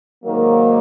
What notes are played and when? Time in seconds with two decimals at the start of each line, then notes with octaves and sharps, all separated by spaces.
0.24 G#2 D#3 F#3 A#3